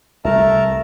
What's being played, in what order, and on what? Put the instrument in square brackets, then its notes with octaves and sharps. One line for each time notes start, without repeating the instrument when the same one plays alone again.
[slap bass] C2 [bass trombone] A3 [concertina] A#4 A5 A#5 [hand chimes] E5